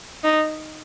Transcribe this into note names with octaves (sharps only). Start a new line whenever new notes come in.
D#4